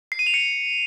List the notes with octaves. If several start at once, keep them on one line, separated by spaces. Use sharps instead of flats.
C7
D#7
F7
C#7